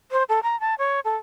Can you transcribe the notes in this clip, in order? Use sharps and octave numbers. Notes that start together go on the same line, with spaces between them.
C5
A4
A#5
A5
C#5
A4